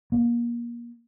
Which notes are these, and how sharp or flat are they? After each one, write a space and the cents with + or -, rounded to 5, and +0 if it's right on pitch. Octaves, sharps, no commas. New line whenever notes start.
A#3 +30